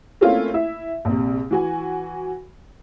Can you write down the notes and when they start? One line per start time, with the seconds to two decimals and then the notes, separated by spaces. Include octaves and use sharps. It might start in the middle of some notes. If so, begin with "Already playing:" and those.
0.21 A3 A#3 C4 C#4 E4 F4
0.54 E4 E5
1.05 A#1 C3
1.51 E3 F#4 G#5